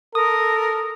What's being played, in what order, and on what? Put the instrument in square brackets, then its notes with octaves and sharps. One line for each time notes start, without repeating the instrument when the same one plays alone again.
[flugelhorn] A4 [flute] A#4 [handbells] D#6